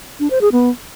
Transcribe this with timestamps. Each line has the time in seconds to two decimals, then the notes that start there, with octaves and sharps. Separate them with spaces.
0.20 D4
0.31 C5
0.41 G#4
0.52 B3